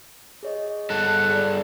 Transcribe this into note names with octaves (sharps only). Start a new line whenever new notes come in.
G#4 C#5 D#5
G2 A4 F#5
G#4 C#5 D5